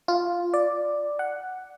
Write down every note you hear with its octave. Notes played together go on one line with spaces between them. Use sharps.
F4
D5
F#5